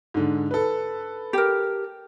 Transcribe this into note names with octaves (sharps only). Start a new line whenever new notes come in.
G#2 D3
A4 B4
G4 A#4